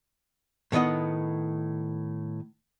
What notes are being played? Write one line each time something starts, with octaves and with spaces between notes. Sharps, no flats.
A2 D#3 B3 D#5 F#5